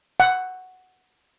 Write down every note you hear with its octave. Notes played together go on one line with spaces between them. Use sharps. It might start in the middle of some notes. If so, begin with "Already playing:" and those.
F#5